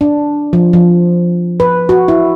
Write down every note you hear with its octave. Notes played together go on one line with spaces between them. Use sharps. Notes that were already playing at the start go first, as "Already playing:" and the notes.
D4
F3
F3
B4
F#4
E4